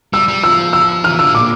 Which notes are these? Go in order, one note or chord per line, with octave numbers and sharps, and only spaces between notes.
G3 E6
G3
F3 E6
E6
E3 F6
D3 E6
A#2 D6